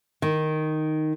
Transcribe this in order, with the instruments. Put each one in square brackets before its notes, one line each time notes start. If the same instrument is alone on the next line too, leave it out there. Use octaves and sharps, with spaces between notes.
[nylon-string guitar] D#3